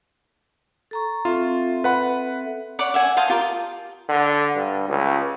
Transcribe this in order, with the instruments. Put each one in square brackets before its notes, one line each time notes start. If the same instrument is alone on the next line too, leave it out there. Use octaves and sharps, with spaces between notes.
[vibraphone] A4 A#5 C#6
[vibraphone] C4 A4 E5 [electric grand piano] F4
[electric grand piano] B4 F#5 B5
[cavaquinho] C#5 D5 F#5 D6
E5 F#5 G#5
C5 D#5 F5 A5
F4 G4 A#4
[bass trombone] D3
G2
C#2